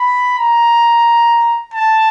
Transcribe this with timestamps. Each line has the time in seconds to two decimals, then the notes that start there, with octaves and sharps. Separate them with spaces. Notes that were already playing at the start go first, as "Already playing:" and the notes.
Already playing: B5
0.39 A#5
1.74 A5